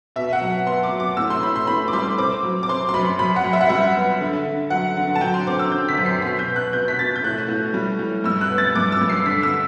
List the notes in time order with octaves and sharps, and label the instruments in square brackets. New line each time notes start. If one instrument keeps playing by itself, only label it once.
[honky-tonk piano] B2 E5
F#5
F#3
B3 C6
D6
F#3
D6
A2 E6
C6
A2 B5
C6
A2 B5
D6
G3 C6
C4 D6
F#3
D6
C4 C6
C6
F#2 B5
F#2 B5
F#5
F#2
E5
F#5
G3 E5
B3
D3
D3
F#3 F#5
D3
A5
F#3 G5
C6
C4 D6
E6
D3 G6
B6
F#2
C7
B2 B6
G6
B3
F#6
B3 G6
B6
B2 A6
G6
A2 F#6
A2
G3
G3
G2 E6
F#6
B3
A6
G2 D6
E6
G2
C7
D3 B6
E6